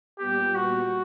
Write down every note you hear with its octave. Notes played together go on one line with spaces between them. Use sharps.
A#2 G3 B3 G4
F#4